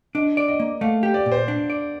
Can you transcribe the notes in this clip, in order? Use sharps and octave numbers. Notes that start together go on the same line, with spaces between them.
D4 D#5
D5
D#5
A#3
A3 F5
G4
D5
A#2
C5
D4
D5